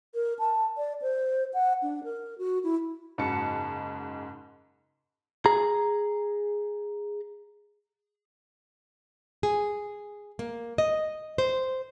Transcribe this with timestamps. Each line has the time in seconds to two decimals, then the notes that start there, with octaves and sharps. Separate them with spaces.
0.15 A#4
0.39 A5
0.77 D5
1.02 C5
1.54 F#5
1.82 D4
2.04 A#4
2.38 F#4
2.64 E4
3.18 F#1 G#2 C#3 F#4 A5 C#7
5.46 G#4 A#5
9.43 G#4
10.39 A#3
10.78 D#5
11.38 C5